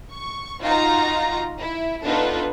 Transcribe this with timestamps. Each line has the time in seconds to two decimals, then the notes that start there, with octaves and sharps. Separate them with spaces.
0.13 C#6
0.61 D#4 F4 F#4 A#5
1.60 E4
2.04 B3 D4 D#4 F4 A4 B4